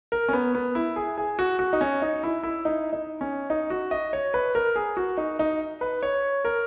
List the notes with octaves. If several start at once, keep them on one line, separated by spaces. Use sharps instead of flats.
A#4
C#4
B3
B3
E4
G#4
G#4
F#4
F#4
D#4
C#4
D#4
E4
E4
D#4
D#4
C#4
D#4
F#4
D#5
C#5
B4
A#4
G#4
F#4
D#4
D#4
B4
C#5
A#4